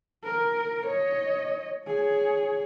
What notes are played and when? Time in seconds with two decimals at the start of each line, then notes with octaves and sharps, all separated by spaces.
0.24 A#4
0.86 C#5 D#5
1.87 G#4 C#5